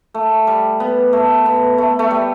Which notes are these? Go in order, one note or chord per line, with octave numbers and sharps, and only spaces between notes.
A3
G3
B3
A3
B3
A3
A3
G3